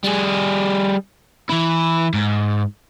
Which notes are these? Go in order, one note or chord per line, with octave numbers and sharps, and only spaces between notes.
G3 G#4
E3 E4
G#2